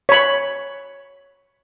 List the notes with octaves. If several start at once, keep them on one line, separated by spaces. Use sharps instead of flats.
C#5 B5